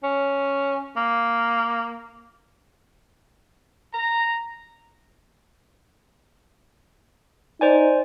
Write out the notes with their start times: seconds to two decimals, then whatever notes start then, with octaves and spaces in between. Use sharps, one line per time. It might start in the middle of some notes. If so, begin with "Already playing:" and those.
0.03 C#4
0.96 A#3
3.94 A#5
7.61 D#4 C5 D5 G#5